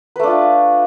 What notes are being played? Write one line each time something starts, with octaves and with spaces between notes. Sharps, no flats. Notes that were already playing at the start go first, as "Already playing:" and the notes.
A3 D4 F4 B4